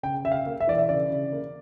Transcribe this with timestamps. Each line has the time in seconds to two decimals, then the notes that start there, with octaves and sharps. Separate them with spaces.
0.03 C#3 G5
0.25 C#3 E5
0.32 F5
0.46 A#3
0.60 E5
0.67 E3 D5
0.78 E5
0.89 C#3 D5
1.10 C#3
1.32 A#3